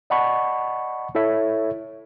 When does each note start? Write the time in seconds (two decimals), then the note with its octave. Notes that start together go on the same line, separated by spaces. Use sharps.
0.10 D5 D#5 F#5 A5 B5 C#6
1.15 E4 A4 C#5 E5